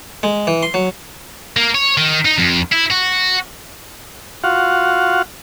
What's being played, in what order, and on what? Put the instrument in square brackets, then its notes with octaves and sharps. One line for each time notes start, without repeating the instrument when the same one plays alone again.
[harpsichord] G#3
E3
C6
F#3
[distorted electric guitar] A#3
C#5
D#3
D#4
F2
E4
F#4
[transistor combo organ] F4 F#4 F5 F#5